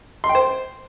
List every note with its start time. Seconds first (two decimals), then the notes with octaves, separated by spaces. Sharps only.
0.24 C6
0.29 G5
0.35 C5